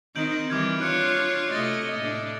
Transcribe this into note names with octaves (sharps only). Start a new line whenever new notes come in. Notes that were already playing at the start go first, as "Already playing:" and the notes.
D#3 C4 D#4 G6 D7 F#7
D#3 E3 G3 D6 F6 G#6
D4 F4 C#5 F#6 C#7 D7
C3 A3 D#5 A6
A2 D4